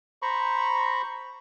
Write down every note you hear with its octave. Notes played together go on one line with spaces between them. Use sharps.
C5 A#5 B5 C#6